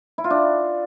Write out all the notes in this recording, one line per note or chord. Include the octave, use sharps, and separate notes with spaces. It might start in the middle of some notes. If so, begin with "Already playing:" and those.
E4
F4
D4